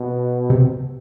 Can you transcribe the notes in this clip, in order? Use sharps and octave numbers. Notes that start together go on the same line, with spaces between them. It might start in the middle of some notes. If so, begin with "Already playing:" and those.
Already playing: B2
C3